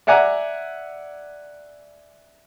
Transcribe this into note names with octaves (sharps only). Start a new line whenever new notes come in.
D5 E5 F#5 G#5 A#5 D6